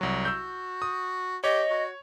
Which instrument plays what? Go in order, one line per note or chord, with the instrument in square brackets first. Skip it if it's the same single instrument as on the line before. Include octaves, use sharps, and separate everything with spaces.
[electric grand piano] C2 F#3 [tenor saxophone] F#4
[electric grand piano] E6 G6
D#6
[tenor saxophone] G4 [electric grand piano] C#5 [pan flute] D#5
[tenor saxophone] F#4